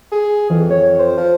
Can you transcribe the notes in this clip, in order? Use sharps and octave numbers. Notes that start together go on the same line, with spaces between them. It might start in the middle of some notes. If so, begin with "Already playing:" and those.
G#4
F2 E3
C#5
C5
F3